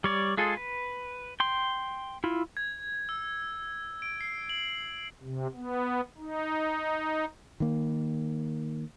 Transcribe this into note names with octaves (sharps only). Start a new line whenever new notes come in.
G3 C#5 D5
G#3 F4 G#4 A4
B4
G5 C6
E4 F4
G#6
E6
D7
C7
F#7
C3
B3
D#4
D#3 A#3